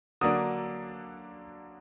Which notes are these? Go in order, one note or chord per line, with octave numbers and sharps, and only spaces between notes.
D3 F#3 A#3 D4 D#6